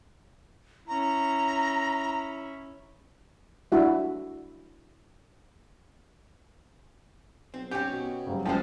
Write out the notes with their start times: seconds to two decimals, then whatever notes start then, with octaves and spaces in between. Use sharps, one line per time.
0.88 C#4 E4 A#5
3.72 D4 E4 F#4 E5
7.54 B1 C4
7.71 C4 C#4 G4 G5
7.90 B2
8.26 C#3 F#3 G3
8.45 F#1 F3 G#3 F4 A4 C5 G5 A5